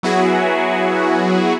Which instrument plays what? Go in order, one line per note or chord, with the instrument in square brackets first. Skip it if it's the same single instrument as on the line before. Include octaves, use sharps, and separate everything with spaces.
[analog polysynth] F#3 B3 E4 F#4 G#4